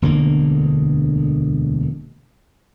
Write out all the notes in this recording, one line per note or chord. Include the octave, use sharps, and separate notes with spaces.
E1 D2 D3 A#3